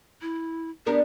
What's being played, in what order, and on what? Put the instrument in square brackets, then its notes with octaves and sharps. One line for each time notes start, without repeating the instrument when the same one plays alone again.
[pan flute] E4
[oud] G3 B3 A#4 [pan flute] D4